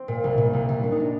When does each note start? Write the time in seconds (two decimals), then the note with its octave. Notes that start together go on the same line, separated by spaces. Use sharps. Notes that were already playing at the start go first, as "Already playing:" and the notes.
Already playing: C4
0.08 A#2
0.24 C2
0.38 A#2
0.53 C2
0.69 C2
0.83 C2 D4
0.92 D#4
1.00 D4